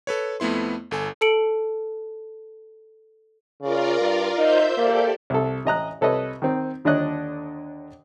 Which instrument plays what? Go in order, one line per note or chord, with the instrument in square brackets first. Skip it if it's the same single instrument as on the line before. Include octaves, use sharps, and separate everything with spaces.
[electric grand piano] A4 B4 C#5
F2 A3 B3 E4 C6
G1 A4 G#5
[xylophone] A4 A5 C#7 D7 F#7
[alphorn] C#3 [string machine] F4 A#4 D5
[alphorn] G2
[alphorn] D#4 [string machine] C5 E5 G6
[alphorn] A#3 [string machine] G4 A4 D5
[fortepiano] C2 A4
A1 D#5 A#5 F#6
C2 A4 B4 C#5 D#5
D#3 C4
D#2 D3 D4 C#5 D#5 F#6